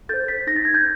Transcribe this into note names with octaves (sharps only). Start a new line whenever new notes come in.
A4 C5 G6 A6
A6 B6
D#4 A#6
A6
G#6
G6 A6